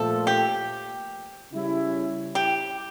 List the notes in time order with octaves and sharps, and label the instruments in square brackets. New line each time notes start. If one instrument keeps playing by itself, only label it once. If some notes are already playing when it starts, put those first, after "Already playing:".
Already playing: [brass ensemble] A#2 F3 A3 [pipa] A4
[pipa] G4
[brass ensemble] C#3 G3 C#4 E4
[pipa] G4